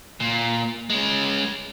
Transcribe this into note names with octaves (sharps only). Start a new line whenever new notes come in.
A#2
G#3 C#4